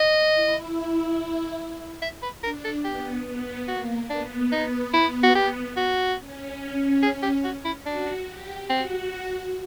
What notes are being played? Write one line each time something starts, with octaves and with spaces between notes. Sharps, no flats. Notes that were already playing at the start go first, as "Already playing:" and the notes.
Already playing: D#5
E4
E5
B4
D4 A#4
A4
B3 G4
B3
A#3 F#4
B3 D4
D#4
E4
F#4
G4
F#4
C#4
G#4
G4
F#4
E4
D4 F#4
G4
C4 F#4